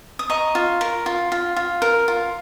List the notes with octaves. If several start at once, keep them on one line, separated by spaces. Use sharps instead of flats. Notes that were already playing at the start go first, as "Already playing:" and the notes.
D#6
D#5 A#5 C#6
F4
A#4
F4
F4
F4
A#4
F4